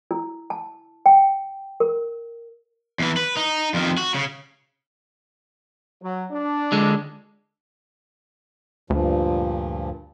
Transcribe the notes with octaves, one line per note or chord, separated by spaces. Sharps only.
E4
A5
G5
A#4
E2 E3
B4
D#4
F2 D#3
F#4
C#3
F#3
D4
D3 G#3
D2 G2 A#2 F3